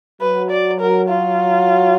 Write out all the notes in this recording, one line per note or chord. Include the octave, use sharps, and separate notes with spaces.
F#3 B4
D5
A#4
F4